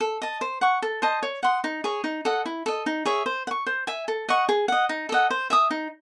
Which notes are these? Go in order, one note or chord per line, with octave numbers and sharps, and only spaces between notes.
A4
D#5 A5
C5
F#5 C#6
A4
C5 D#5 A5
C#5
F#5 C6 D#6
D#4
G#4 C#5
D#4
A4 D#5 F#5
E4
A4 D#5
D#4
G#4 C#5 E5
C5
F#5
C#6
C5
E5 G#5
A4
D#5 F#5 C#6
G#4
D#5 F#5
D#4
A4 D#5 F#5
C5
E5 G#5 D#6
D#4